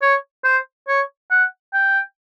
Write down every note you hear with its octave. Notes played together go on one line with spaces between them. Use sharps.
C#5
C5
C#5
F#5
G5